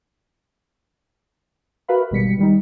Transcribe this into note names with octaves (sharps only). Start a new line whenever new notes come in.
F#4 A#4 B4 E5 F5 B5
G#1 B2 G3 B6 C#7
D#3 G3 D#4